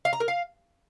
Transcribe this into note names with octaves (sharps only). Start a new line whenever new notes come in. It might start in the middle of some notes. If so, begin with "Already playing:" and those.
F5
A#5
A#4
F5